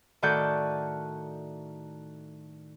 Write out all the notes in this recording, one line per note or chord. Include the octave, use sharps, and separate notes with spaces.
A2 D#3 F#4 A4 D5 G6